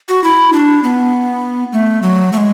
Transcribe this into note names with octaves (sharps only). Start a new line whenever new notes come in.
F#4
E4
D4
B3
A3
F#3
A3
G#3